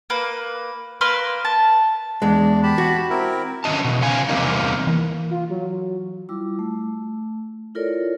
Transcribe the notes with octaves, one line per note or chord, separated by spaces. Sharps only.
A#3 B4
A#3 B4 C6 F6
A5
E2 G#3 D4
G4 A5 B5
F#4
C4 E4 A#4
D3 D#3 C#4 D#5 A5
B2 E3
C#3 F3 F4 G#5
E2 C3 G3 A#3 D#4
E3 A#3
F4
F#3
G3 E4 F4 D6 E6
A3
E4 F4 A4 A#4 C#5 D5